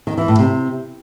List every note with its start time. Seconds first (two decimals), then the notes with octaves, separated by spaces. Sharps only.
0.07 D#3
0.18 E3
0.28 A2
0.39 C3